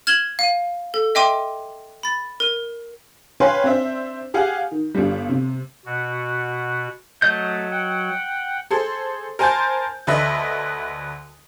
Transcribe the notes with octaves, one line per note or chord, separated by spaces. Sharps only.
F6 G#6 E7 F#7 G7
F5 D#7
A4
D#5 E5 G5 C6 D6 D#7
B5 A6
A#4 D#7
B4 C#5 F5 G5 G#5 C6
C4 D4 C5 E5
G4 G#4 F5 F#5 G#5
D#3
G1 G2 G3
C3
B2 F#4
F#3 A3 D#5 G6
F#5 G5
G#4 A4 C5
A#4 C5 G#5 A5 C6 G6
D2 D3 B4 D#5 E5